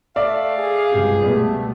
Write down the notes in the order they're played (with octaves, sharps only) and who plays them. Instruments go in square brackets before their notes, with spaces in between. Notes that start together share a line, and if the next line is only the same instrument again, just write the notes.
[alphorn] A3 [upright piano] D5 E5 [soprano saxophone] F5
[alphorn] G#4
[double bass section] C#2 G2 C3 [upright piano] G4
[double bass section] B2 A3 [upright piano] G3 B3